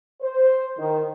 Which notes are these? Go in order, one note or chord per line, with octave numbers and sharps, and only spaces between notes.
C5
D#3